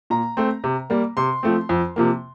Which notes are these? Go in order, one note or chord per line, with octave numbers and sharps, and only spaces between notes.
A#2 A#5
A3 C4
C3
G3 A#3
C3 C6
F3 A3 C4
F2
C3 F3 A#3